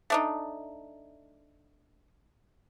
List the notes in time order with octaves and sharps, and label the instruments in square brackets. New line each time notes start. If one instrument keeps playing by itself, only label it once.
[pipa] A3 D4 D#4